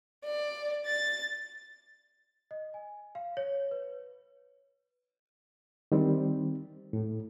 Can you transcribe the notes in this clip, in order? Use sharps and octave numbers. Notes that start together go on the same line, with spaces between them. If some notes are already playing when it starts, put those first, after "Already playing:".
D5
A6
D#5
G#5
F5
C#5
B4
D#3 G3 C4
A2